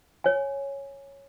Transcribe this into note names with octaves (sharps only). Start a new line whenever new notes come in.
C#5 G#5